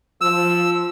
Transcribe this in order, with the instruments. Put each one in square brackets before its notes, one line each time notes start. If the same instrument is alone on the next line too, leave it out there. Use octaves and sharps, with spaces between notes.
[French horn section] F3 [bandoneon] E6